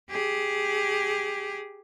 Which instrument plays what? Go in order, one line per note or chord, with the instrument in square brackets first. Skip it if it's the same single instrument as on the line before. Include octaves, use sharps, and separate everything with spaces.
[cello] G4 G#4